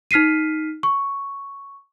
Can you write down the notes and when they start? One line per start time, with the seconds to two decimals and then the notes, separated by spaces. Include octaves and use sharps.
0.11 D#4 F6 B6 C7 D#7
0.83 C#6